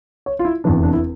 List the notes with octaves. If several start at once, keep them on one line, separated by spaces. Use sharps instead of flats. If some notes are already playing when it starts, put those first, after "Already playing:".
C#5
F4
E4
F1 E2 E3 D4
D4
E4